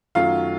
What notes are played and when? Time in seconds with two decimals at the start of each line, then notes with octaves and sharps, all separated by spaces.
0.15 F#2 D#3 F#3 A3 F4 F5